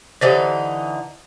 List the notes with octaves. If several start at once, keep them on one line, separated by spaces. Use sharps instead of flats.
D3 E3 D#4 G4 C5 C#5